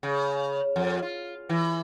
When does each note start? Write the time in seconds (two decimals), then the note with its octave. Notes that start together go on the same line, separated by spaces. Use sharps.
0.03 C#3
0.76 F2
1.02 F4
1.49 E3